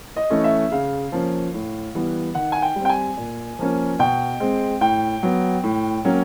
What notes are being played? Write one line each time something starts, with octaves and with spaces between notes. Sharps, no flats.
D#5
E3 A3 C#4
E5
C#3 F5
F3 A#3 C#4
A2
E3 G3 B3
D#3 F#5
G#5
G5
G3 C4
G5
G#5
A#2
F3 A#3 C#4
B2 G5
G#3 C4
A2 G5
F#3 B3
A2
F#3 A#3 C#4